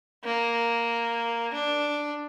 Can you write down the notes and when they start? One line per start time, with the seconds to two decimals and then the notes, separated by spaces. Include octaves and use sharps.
0.24 A#3
1.53 D4